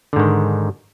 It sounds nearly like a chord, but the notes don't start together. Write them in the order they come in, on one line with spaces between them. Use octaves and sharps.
D3 G#2 D#3